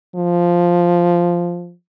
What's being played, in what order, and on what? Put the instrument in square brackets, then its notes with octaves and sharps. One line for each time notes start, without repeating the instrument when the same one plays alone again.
[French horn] F3